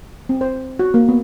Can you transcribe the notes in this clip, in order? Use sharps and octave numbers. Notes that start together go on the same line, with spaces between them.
C4
C5
F#4
A#3
B3